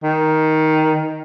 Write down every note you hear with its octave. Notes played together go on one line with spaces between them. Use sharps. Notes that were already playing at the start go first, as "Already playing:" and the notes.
D#3